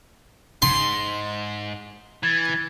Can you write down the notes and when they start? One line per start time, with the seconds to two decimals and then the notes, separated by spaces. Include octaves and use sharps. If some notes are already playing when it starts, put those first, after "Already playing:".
0.62 G#2 C6
2.23 E3 G#6 A6